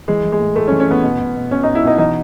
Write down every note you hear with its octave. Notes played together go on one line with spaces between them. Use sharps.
E3 G#3
E3
G#3
A2
A2 A3
C#4
E3
C#4
E3 B3
B2
B2
B2
B2 C#4
B2 D#4
E4
B2 D#4
E3 D#4